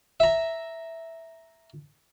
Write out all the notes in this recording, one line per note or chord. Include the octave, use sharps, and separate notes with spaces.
E5 A#5